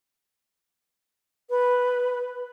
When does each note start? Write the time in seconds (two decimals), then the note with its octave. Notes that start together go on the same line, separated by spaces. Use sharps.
1.49 B4